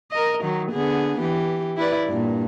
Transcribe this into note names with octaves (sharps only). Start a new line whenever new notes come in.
A#4 D#5
D#3 F#3 D#4
D3 B3 G#4
E3 G4
E4 B4 D5
G2 A#2